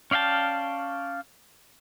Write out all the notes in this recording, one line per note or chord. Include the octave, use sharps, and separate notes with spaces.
C#4 D5 F5 G5 A5